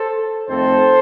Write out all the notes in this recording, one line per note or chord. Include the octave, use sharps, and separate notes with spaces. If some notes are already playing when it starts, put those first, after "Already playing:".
Already playing: A4 C5
F2 D#3 A3 C4 A4 C5